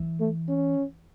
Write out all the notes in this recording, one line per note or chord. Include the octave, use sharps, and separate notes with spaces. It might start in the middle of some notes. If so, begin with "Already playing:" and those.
Already playing: E3
A3
C#4